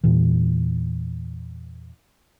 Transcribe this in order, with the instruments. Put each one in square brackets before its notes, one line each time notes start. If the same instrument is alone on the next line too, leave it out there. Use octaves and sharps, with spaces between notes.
[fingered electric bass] E2 A#2 E3